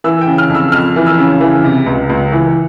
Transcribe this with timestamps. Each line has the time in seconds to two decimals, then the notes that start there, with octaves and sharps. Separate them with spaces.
0.04 E3 E6
0.21 G5
0.27 C#3
0.38 F6
0.49 F2
0.55 E6
0.72 F2 F6
0.96 E3
1.06 E6
1.18 C#3
1.41 E3
1.64 C3
1.86 C#2
2.10 C#2
2.32 E3